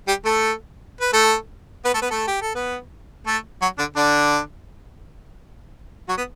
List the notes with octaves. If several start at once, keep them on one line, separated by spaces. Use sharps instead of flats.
G3 G4
A3 A4
B4
A3 A4
B3 B4
A3 A4
B3 B4
A3 A4
G4
A4
B3 B4
A3 A4
F#3 F#4
D3 D4
D3 D4
F#3 F#4
B3